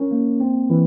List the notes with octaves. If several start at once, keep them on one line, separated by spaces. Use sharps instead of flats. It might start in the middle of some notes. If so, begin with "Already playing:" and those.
Already playing: C#4 A#4
A#3
C4
E3